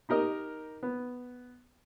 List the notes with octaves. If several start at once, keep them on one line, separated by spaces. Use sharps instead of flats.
D#4 G4 A#4 D#5
B3